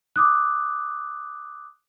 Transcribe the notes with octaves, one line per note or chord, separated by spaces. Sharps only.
D6 D#6 F#6